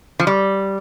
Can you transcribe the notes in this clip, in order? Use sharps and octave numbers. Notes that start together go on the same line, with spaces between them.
F3
G3